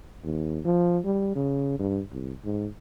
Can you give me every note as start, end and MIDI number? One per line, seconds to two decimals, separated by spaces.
0.23 0.60 39
0.65 0.98 53
1.05 1.31 55
1.35 1.77 49
1.79 2.01 43
2.12 2.32 36
2.45 2.67 44